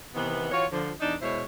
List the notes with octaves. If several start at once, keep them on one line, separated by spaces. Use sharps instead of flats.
C3 D#3 E3 B3
E3 F4 F#4 C#5
D3 F3
E2 D4 D#4
B2 G#3 E4 C5 C#5